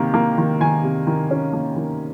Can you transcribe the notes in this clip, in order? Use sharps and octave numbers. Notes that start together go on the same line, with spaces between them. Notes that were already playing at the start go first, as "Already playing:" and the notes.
Already playing: C3 D#3 A#3
A#3
D#3
D#3 G#5
C3
D#3
C#4
A#3
D#3